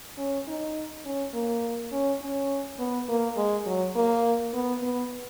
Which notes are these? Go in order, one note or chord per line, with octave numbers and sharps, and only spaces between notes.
C#4
D#4
C#4
A#3
C#4
C#4
B3
A#3
G#3
F#3
A#3
B3
B3